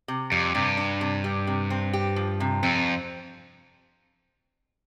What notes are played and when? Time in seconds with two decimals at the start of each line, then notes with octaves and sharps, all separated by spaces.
0.08 C3
0.32 F2 G3
0.55 G2 C3
0.77 D4
1.01 C3
1.24 G3
1.47 C3
1.70 C4
1.93 G4
2.16 F3
2.40 C3
2.63 F2 C4